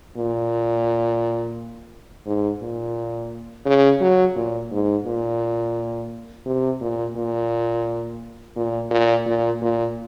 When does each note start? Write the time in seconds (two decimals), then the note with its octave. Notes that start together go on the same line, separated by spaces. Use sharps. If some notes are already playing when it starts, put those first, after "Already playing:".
0.17 A#2
2.26 G#2
2.62 A#2
3.66 C#3
4.01 F#3
4.36 A#2
4.72 G#2
5.06 A#2
6.46 C3
6.81 A#2
7.16 A#2
8.56 A#2
8.91 A#2
9.26 A#2
9.61 A#2